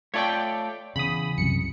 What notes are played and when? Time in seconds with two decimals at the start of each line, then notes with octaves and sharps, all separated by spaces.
0.14 A3 F4 A4 C#5 D5 G5
0.96 E2 C#3 B5 D#6
1.38 C2 F#2 C#7